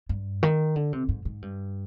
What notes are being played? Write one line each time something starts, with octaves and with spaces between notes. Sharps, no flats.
G2
D#3
D3
C3
G#2
G#2
G2